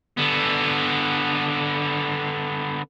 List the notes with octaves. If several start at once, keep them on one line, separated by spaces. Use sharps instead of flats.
D3 B3